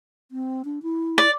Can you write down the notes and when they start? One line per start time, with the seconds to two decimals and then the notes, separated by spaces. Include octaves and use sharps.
0.31 C4
0.65 D4
0.83 E4
1.18 D5